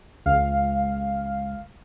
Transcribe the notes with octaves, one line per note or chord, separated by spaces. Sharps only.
C#2 F5